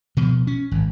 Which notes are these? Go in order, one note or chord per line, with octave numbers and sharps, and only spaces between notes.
B2 F3
C#4
G#1